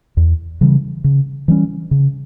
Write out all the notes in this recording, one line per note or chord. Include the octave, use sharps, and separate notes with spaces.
E2
C#3 E3 G3
C#3
E3 G3 C#4
C#3